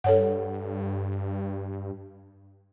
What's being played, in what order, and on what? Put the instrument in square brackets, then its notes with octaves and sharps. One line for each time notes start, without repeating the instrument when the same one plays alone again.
[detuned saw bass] G2 [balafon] A4 C#5 F#5